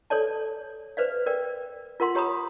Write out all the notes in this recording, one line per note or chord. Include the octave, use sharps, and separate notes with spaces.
A4 C#5 D5 A5
B4 C5 D5 F5
A#4 D5 G5
F4 A#4 F#5 C6
G4 C#5 A#5 B5 D#6